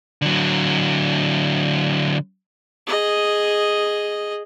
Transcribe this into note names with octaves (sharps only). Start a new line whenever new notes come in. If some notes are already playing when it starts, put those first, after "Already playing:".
D3 F#3
G#4 D#5